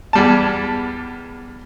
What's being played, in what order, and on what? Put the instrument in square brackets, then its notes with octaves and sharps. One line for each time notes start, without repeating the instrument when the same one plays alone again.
[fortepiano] E2 G3 A5